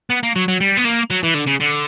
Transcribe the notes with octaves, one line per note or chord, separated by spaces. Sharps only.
B3
A#3
F#3
F#3
G3
B3
A#3
F#3
E3
D3
C#3
D3